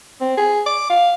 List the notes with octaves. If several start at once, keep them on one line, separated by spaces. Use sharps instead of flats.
C4
G#4
D6
F5